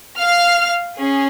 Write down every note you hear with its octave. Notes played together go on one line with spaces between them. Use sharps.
F5 F6
C#4 G#4